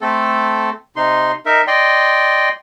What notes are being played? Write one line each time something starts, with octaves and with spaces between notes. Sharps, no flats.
A3 C4 A4
C3 D#4 C6
D#4 A#4 E5
D5 D#5 G5 C6